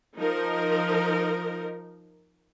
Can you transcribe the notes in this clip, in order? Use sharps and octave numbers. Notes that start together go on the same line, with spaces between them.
F3 D#4 A#4